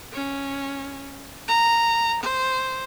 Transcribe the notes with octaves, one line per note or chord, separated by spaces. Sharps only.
C#4
A#5
C5